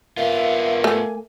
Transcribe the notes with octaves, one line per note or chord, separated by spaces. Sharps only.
A#3 B3 F4 E5
A3 G#5